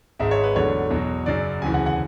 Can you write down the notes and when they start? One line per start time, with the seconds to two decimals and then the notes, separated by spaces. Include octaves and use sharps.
0.19 G#1 G#2 G#3 E5
0.31 C#5
0.44 B4
0.55 E2 D3 F#3 A3 C#5
0.90 E2 B2 F#3
1.26 F#2 C#3 F#3 D5
1.62 E1 D2 C#3 E3 G#5
1.74 F#5
1.86 F#5